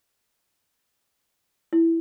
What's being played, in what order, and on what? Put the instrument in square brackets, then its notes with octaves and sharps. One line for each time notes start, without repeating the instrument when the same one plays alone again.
[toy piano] E4